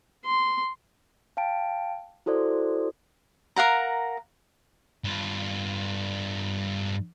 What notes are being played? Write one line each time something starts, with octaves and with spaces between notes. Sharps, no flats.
C6
F5 G5 A5 D7
E4 F#4 A4 C5 D5
A#4 F5 F#5 A#5
G2 F4